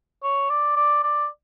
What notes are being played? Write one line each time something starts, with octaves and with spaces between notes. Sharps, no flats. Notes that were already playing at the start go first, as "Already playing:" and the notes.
C#5
D5
D5
D5